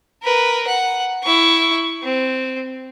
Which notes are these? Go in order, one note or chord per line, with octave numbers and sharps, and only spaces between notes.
A#4 B4
F#5
E4 C#6
C4